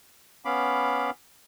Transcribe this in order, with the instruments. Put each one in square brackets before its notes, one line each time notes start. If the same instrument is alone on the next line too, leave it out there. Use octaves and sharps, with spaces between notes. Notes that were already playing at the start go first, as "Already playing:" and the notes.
[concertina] B3 C#4 F5 B5 D6